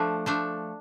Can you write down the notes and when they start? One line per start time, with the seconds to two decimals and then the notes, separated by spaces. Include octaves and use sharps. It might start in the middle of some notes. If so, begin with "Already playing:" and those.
Already playing: F3 A3 D4
0.26 F3 A3 D4